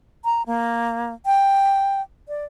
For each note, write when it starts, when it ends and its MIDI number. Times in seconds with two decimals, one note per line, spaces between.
0.25 0.42 82
0.46 1.14 58
1.26 2.01 79
2.28 2.45 74